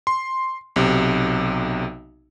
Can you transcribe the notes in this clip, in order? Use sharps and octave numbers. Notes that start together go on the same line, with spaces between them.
C6
B1 C3